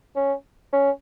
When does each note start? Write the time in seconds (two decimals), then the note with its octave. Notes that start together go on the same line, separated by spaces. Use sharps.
0.16 C#4
0.73 C#4